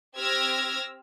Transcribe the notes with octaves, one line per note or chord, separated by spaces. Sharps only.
C4 G4 E6 F6 G#6 A#6